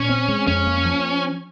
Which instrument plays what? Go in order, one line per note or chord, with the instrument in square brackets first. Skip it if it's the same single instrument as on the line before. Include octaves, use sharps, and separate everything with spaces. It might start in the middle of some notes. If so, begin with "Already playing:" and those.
Already playing: [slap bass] A#2 [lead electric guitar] C#4
[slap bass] C4
G#3
[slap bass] F2 [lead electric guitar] C#4
[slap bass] A#3
F3